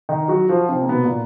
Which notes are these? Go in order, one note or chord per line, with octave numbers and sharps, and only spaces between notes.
D#3 D#4
F#3 F#4
F3 F4
C3 C4
A#3
B2 B3
A#2 A#3